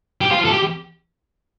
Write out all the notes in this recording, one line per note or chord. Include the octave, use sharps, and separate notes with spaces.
G4
F4
A4
G4